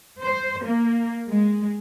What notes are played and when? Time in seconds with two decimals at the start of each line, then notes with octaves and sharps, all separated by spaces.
0.21 C5
0.64 A#3
1.28 G#3